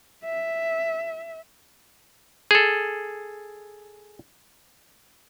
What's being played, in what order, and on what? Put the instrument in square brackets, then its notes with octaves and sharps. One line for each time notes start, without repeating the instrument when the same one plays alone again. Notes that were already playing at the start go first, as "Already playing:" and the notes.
[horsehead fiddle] E5
[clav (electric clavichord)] G#4 A4